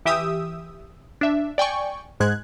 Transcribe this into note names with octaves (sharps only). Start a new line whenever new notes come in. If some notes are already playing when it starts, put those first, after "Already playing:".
E3 G4 E5 D#6 E6
D4 E5
D5 G5 G#5 C#6
G#2 G#3 F#6 G#6